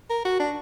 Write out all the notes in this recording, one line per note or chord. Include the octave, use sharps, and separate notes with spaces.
A#4
F#4
D4